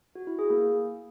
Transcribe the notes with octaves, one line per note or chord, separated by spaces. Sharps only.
F#4
E4
G#4
A#3